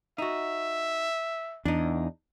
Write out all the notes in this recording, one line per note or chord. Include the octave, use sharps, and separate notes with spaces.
D#4 F#4 E5
E2 D4 D#4